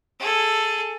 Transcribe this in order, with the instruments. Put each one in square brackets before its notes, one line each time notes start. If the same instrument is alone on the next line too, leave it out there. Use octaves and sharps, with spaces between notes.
[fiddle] G#4 A4